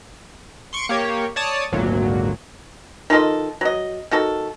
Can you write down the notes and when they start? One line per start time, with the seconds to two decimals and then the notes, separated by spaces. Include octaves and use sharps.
0.73 C6 C#6 C#7 D7
0.89 A#3 G4 C#5
1.36 C#5 D5 A5 D#6
1.72 G#1 D2 A#2 F#3
3.10 D#3 F4 A4 D#5
3.61 F#3 D#5
4.11 D#3 F#4 A4